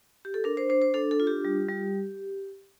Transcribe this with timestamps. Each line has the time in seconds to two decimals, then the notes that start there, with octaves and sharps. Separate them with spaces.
0.25 G4
0.34 A4
0.44 D4 A#4
0.57 C5
0.69 D4 C5
0.82 C5
0.94 D4 A4
1.11 A4
1.20 F4
1.27 G4
1.45 G3
1.69 G3